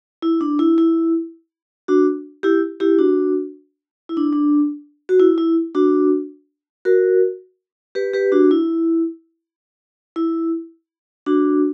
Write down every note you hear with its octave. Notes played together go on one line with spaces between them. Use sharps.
E4
D4
E4
E4
D4 F#4
E4 G4
E4 G4
D4 F#4
E4
D4
D4
F#4
E4
E4
D4 F#4
F#4 A#4
G4 B4
G4 B4
D4 F#4
E4
E4
D4 F#4